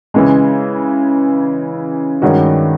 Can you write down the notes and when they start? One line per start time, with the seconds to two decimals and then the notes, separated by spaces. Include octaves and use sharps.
0.14 C#3 E3 G#3
2.22 G2 D#3 G#3 C#4 F#4